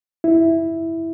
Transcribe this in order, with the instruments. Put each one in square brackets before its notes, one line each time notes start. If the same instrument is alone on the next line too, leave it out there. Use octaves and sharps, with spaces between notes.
[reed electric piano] E4